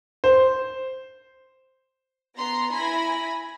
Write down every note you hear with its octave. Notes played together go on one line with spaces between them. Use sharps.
C5
B3 A#5 C6
E4 G#5 B5 A#6